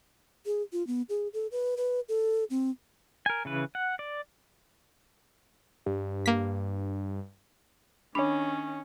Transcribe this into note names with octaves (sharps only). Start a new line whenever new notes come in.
G#4
F4
B3
G#4
A4
B4
B4
A4
C4
A#4 G#5
C#3 E3 B4
F#5
D5
G2
A#3 B6
D#3 C#4 D4 C#5 B5